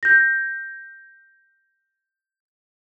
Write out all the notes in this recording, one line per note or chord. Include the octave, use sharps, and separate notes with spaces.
G6 A#6